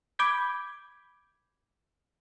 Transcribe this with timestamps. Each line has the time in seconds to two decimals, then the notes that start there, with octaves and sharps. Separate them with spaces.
0.19 B5 D6 G6 G#6 B6